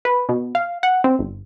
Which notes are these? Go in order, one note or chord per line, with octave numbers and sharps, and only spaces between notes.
B4
B2
F5
F#5
C4
G1